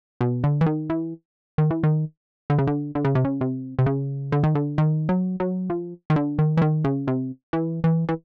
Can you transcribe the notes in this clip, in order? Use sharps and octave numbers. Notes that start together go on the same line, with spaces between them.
B2
D3
E3
D#3
E3
D#3
E3
D#3
D3
C#3
D3
D3
C#3
C3
C#3
C3
C3
C#3
D3
D#3
D3
D#3
F#3
F#3
F3
D#3
D3
D#3
E3
D#3
C#3
C3
E3
E3
E3